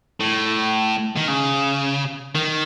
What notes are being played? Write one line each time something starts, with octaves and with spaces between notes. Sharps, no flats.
A2
D#3
C#3
D#3